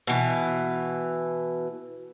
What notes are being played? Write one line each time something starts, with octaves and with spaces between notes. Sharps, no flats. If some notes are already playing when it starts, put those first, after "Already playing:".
B2 E3